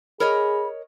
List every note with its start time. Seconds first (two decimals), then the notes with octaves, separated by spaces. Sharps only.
0.20 G#4 A#4 C#5 D#5 B5